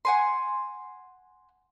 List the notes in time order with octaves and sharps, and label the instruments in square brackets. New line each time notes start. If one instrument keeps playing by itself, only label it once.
[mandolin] F#5 G#5 C6